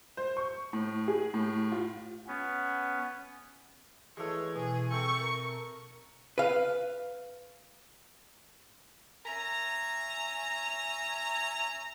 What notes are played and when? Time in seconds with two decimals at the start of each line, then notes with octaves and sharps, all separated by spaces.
0.17 C5
0.37 C#6
0.73 A2
1.08 G#4
1.34 A2
1.72 F4
2.27 B3 C#4
4.17 E3 G#3 A3 C#5
4.56 B2 G#4
4.91 A3 C4 C#6
5.20 A#4
6.38 B4 F5
9.26 C#4 E5 G#5 A#5